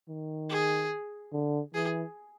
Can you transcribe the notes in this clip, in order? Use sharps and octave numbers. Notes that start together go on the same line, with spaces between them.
D#3
G#4
D3
E3 G#4